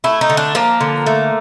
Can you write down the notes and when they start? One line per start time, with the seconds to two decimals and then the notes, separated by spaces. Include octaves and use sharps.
0.04 A3 E4
0.21 D#4
0.30 D3
0.37 D4
0.55 F3 A#3
0.81 D3
1.06 A3